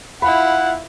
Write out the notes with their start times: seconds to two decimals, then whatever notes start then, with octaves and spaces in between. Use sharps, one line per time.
0.22 E4 F4 F#5 B5